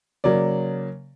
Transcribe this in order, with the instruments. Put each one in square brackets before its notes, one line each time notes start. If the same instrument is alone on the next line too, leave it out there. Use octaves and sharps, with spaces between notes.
[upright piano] C#3 F#3 A#3 D5